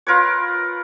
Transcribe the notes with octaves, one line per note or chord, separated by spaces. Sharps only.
F4 A#4 B4 C#5